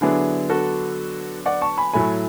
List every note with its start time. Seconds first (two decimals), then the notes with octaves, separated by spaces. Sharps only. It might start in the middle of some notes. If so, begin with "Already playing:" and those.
0.01 D3 F#3 B3 D4 E4 G#4
0.50 F#4 A4
1.46 D5 F#5
1.62 A5 C#6
1.78 G#5 B5
1.93 A2 F#3 A3 G#5 B5